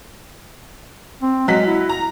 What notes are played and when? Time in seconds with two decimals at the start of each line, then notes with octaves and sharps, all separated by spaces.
1.22 C4
1.48 F#3 G#3 B6
1.67 E4
1.89 A#5